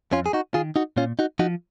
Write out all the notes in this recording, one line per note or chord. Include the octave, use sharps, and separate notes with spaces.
F2 C#4 F4
G#4
D#4 F#4
D#3 F4 G#4
D#4 F#4
A#2 C#4 F4
D#4 F#4
F3 D#4 F#4